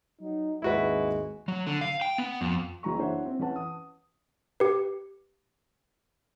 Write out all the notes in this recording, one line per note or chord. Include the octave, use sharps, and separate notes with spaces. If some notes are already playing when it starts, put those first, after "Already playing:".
F#3 D#4
G#1 D#2 G#3 E4 F#4 B4
F#3
D3
F5
G5
B3
F2
F#1 E3 F#3 A#5 C#6
D4 E4 C5 C#5 E5 F#5
C4
E3 C#4 B4 F#5 A5
D#6
G4 B4